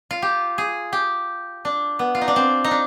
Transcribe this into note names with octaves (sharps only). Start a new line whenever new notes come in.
F4
G4
G#4
G4
D4
B3
F4
D#4
D4
C4
D#4
D4